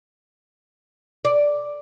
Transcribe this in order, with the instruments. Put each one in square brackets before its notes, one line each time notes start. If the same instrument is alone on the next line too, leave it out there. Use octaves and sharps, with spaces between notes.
[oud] D5